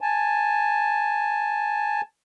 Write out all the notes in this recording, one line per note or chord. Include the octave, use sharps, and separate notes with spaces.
G#5 A5